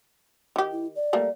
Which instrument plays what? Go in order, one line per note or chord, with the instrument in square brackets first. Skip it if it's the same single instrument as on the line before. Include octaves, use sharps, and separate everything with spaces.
[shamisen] D#3 G4
[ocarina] E4
D5
[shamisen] G3 A3 A#3